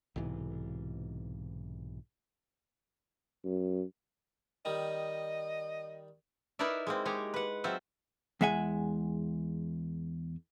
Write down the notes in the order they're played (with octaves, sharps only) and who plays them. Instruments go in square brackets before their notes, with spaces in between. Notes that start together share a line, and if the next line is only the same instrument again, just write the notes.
[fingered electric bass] B1 G#2 C3 E3
[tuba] F#2
[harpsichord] D#3 G3 [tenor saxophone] D#5
[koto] D#4 E4 A#4 B4 D5 E5
G#3 A#3 C4
G#3 G4 C#5 G#5 A#5
B4 F#5
F#3 C4 F4 C5 E5
[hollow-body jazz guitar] E2 G#3 E5 F#5 G#5